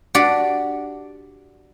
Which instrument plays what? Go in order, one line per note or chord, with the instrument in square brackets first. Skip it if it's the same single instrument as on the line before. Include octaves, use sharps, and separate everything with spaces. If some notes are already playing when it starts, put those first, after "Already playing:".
[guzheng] D4 F#4 G4 D5 F#5